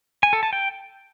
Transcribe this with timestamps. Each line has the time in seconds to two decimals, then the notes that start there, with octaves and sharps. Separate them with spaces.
0.23 G#5
0.33 A4
0.43 A5
0.53 G5